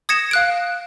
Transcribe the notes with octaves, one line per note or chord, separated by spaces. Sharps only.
D#6 G#6 A#6 C#7 E7
F5 F#6 D7